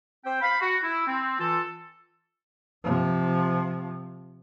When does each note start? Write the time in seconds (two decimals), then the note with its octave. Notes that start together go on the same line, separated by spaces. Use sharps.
0.24 C4 C5 G5
0.41 F5 B5
0.60 F#4
0.82 E4
1.06 C4
1.38 E3 F4 A4
2.84 C3 F3